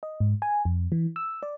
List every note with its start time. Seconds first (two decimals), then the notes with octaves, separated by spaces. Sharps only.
0.03 D#5
0.20 G#2
0.42 G#5
0.65 F2
0.92 E3
1.16 E6
1.43 D5